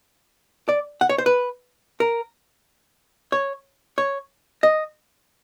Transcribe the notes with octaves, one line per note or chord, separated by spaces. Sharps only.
D5
F#5
C#5
C5
B4
A#4
C#5
C#5
D#5